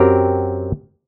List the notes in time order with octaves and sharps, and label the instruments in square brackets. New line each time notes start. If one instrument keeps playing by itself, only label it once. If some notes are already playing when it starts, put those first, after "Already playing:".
Already playing: [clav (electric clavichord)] F#2 F#3 C4 G4 A#4